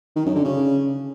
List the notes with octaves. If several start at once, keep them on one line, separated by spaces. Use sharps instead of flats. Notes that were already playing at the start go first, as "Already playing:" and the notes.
D#3
F#2
D3
C#3